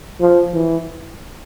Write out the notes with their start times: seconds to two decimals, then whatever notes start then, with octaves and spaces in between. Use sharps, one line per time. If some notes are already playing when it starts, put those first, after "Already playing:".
0.20 F3
0.54 E3